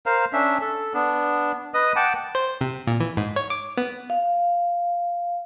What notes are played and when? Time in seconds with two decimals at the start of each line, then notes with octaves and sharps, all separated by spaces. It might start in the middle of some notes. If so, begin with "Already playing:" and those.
0.06 A#4 C5 F5
0.33 C#4 D4 E5
0.61 A4
0.94 B3 D4
1.74 B4 D#5 D#6
1.96 F#5 G5 A5 D6
2.35 C5
2.61 C3
2.87 A#2
3.00 E3
3.17 G#2
3.36 C#5
3.50 D6
3.77 B3
4.10 F5